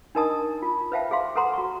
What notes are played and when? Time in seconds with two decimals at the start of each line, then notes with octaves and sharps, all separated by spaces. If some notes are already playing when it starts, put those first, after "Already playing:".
0.15 D4 D#4 A#4 D#5 A5 D#6
0.62 F4
0.92 B4 C5 E5 F5 G5 A5
1.11 G#4 E5 F5 C6
1.35 A4 B4 F#5 A#5 C6
1.53 F#4 C#6